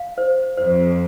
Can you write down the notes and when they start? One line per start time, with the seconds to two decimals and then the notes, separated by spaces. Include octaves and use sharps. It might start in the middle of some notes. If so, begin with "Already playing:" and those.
Already playing: F5
0.18 C5
0.57 F2 C5